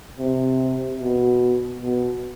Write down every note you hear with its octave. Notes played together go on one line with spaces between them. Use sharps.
C3
B2
B2